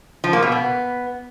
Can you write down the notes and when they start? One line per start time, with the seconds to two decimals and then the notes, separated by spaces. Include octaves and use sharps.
0.24 F3
0.33 A#3
0.43 B2
0.52 B3